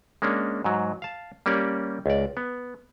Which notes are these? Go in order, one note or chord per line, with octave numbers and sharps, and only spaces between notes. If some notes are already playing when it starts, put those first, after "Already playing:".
G#3 A#3 C#4 D4
G#2 F#3
F5 A5
G3 A#3 C#4 G4 D5
C#2 D5
B3